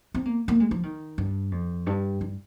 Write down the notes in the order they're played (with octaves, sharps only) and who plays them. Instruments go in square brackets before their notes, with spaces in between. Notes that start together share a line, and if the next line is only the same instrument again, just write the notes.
[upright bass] C4
A#3
A#3
G#3
F3
D#3
G2
F2
G2
G2